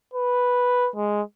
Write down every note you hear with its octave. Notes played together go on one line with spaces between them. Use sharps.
B4
G#3